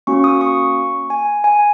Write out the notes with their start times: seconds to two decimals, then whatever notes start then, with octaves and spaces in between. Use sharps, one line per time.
0.07 A#3 C#4 F#4 C#6
0.24 D#6
0.41 C#6
1.10 G#5
1.44 G#5